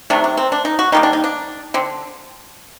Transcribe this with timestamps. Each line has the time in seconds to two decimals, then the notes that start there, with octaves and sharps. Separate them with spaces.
0.10 C3 D#3 F#3 A3 D4
0.24 D4
0.37 C4
0.52 D4
0.65 D#4
0.79 F#4
0.92 D#3 G3 A#3 D#4
1.03 D4
1.13 D#4
1.24 D4
1.74 D3 C4